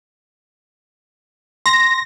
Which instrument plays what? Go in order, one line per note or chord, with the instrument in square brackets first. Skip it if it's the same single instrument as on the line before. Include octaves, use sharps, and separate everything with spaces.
[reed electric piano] C6 [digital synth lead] A#6